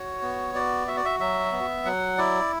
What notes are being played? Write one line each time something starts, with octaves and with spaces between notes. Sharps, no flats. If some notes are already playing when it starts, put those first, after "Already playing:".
Already playing: F#4 C#5
B3
F#4 D5
F#4 E5
D5
E5
F#3 E5
B3
F#3 F#5
E4 D5